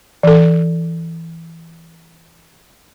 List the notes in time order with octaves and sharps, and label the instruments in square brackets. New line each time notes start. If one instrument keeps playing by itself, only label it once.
[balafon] E3 A4